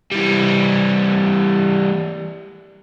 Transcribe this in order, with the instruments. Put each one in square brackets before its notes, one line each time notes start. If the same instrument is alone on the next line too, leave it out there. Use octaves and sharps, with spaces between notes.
[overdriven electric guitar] E3 G3